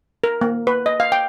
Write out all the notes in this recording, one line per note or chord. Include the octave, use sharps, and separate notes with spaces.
A#4
A#3
B4
D#5
F5
G5